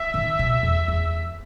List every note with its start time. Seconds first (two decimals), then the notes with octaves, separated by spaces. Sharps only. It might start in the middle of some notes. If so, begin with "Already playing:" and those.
Already playing: E5
0.14 D#3
0.39 B2
0.63 E2
0.88 E2